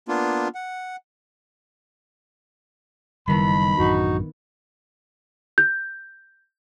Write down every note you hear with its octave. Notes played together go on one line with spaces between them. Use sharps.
A#3 B3 D4 F4
F#5
F#1 D#3 G3 B3 E4 B5
A1 F#2 D4 D#4 F#4
G6